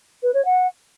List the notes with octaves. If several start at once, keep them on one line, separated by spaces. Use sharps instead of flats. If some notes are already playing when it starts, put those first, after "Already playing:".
B4
C#5
F#5